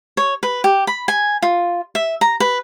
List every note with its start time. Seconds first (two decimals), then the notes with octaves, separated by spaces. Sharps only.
0.17 C#5
0.43 B4
0.64 G4
0.87 B5
1.08 G#5
1.42 F4
1.95 E5
2.21 A#5
2.40 B4